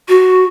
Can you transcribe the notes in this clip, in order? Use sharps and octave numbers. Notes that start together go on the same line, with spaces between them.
F#4